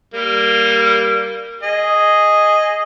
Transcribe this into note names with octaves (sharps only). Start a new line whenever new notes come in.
G3 A#3
G#4 D#5